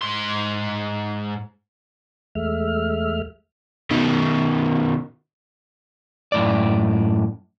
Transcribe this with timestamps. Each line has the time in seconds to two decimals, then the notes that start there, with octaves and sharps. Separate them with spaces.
0.01 G#2 C6
2.35 E2 G#3 A3 E5 F6
3.90 B2 D#3
6.32 F#2 A2 D5